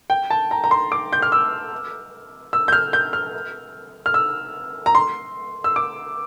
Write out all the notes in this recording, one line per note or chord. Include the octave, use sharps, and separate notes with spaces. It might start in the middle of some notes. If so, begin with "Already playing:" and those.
G5
A5
A#5
A#5
C6
D6
G6
F6
E6
E6
G6
F6
G6
F6
F6
E6
A#5
C6
E6
D6